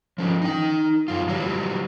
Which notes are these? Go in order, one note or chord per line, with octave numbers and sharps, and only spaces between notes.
F3 C#4
D#4 G5
F#2 F4
E3 F#3 G3